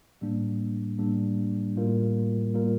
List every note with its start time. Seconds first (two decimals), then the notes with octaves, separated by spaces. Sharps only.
0.21 A2 G3 A#3 D4
0.98 A2 G3 A#3 D4
1.76 A2 G3 A#3 F4 A#4
2.54 A2 G3 A#3 F4 A#4